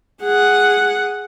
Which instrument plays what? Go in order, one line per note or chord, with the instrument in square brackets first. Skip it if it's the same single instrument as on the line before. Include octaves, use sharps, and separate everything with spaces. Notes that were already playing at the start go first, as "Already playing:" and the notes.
[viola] G#4 F#5